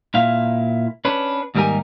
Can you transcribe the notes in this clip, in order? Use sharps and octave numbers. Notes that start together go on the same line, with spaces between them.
A#2 E4 F5
C#4 D4 B4
D#2 G#2 G3 G4 A#4 G#5